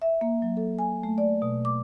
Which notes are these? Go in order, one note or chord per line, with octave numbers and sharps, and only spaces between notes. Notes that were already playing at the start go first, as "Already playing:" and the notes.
E5
A#3
F#3
A4
G#5
A3
D5
B2
D6